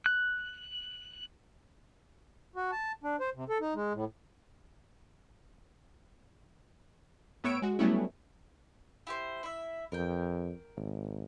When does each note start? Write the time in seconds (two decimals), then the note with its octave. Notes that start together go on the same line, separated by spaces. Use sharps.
0.06 F#6
2.56 F#4
2.72 A5
3.04 D4
3.20 C5
3.35 C3
3.49 A4
3.61 D#4
3.75 G#3
3.93 A2
7.44 A2 B3 C#5 E6 D7
7.62 G#3 F#4
7.79 F#3 G3 A3 B3 C#4 E4
9.07 E4 G4 C5
9.43 E4 E5
9.92 F2 A#4 G5
10.77 G#1